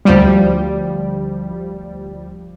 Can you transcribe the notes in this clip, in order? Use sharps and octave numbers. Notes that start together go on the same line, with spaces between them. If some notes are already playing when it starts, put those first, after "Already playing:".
D2 F3 G3